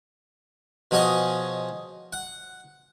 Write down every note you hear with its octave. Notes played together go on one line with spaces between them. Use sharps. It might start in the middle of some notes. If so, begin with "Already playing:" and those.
B2 F3 G#4 C#5 D#5
F#5